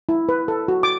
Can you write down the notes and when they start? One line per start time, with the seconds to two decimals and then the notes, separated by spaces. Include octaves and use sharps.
0.09 E4
0.29 B4
0.48 A4
0.68 F#4
0.83 D6